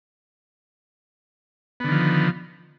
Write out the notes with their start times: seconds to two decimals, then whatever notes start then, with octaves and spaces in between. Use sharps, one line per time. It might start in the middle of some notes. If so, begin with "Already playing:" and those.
1.80 B3
1.84 D3
1.88 D#3
1.92 F3